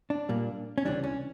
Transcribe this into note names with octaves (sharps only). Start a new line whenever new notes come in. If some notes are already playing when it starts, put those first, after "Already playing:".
D4
A#2 G3 A#3
C#4
C#2 C3 E3 G3 D4
C#4